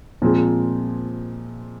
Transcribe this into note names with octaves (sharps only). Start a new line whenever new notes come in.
A#2 F3 G#3 C4